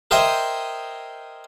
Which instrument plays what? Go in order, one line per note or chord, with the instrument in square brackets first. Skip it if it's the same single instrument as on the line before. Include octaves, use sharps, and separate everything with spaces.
[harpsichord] A#4 C5 D#5 E5 G5 G#5